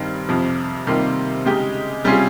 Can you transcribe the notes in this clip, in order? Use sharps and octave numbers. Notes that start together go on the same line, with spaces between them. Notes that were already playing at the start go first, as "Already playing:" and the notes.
Already playing: G2 D#3 G3 C4
F2 C3 F3
C3 D#3 G3 A#3 F4
C#3 G#3 D#4 G4
C3 G3 C#4 F4 G#4